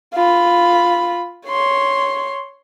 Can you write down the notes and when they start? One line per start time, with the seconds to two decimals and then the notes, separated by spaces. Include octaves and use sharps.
0.14 F4 B5
1.47 C#5 C6